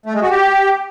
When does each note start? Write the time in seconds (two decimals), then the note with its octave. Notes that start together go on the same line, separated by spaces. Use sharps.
0.06 A3
0.14 G#3
0.22 F#4
0.30 G4